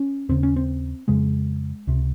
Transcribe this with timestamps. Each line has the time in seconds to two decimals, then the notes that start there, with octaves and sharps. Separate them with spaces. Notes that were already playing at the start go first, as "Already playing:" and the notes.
Already playing: C#4
0.29 D#2 C#3 C4
0.43 C#4
0.56 C4
1.08 F2 C#3 G#3
1.87 C#2 C3